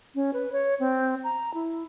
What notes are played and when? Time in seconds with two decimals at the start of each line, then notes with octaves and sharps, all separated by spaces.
0.15 C#4
0.33 B4
0.52 C#5
0.80 C4
1.24 A#5
1.54 E4